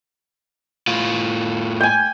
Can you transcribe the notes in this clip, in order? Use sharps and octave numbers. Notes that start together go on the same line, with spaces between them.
A2 F4
G5 G#5